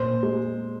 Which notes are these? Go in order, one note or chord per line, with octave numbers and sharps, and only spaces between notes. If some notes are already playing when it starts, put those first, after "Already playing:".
Already playing: A#2 C5
G#3